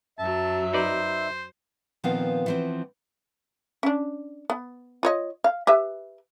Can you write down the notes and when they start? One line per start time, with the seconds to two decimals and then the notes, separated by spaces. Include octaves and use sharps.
0.19 F#2 F#3 E5 A5
0.73 D#4 B4 C5 D5
2.04 A#2 D#3 F3 B3 C4 F5
2.46 E3 F3 C4
3.83 C#4 D4
4.50 B3
5.03 F4 C#5 D#5
5.44 F5
5.67 G4 B4 E5